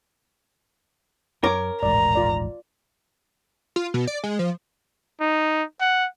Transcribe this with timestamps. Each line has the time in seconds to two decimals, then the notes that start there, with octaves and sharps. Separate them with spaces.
1.44 F#2 A#4 C#5 D6
1.83 D#1 A1 G#2 D5 A#5
2.15 F4 D5
3.76 F4
3.94 B2
4.07 D5
4.24 G#3
4.39 F3
5.20 D#4
5.80 F#5